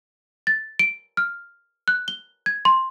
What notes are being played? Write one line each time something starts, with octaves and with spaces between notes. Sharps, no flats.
A6
D7
F6
F#6
G7
G#6
C6